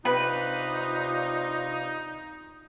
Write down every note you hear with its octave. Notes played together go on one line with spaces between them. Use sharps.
C3 D4 D#4 F4 B4